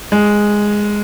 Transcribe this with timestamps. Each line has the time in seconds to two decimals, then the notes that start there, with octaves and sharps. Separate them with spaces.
0.12 G#3